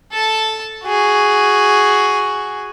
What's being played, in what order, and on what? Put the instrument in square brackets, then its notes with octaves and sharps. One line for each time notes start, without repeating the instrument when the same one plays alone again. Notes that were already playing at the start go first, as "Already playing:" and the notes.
[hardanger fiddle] A4 A5
F#4 G#4